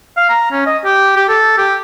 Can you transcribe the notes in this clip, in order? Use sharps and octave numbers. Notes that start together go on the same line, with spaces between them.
F5
A#5
C#4
D#5
G4
G4
A4
G4